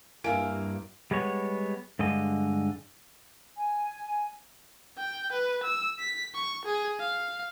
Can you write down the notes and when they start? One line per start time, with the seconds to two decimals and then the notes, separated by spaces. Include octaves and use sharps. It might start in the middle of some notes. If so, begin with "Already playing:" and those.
0.24 G2 A#3 E4 F5 G#5 D7
1.11 G3 G#3 B3 C#5
1.99 G2 D3 G#3 D#5
3.56 G#5
4.98 G5
5.32 B4
5.64 E6
5.99 B6
6.35 C#6
6.66 G#4
7.00 F5